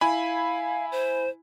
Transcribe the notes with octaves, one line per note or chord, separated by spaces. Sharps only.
E4 F5 G#5 B5
C5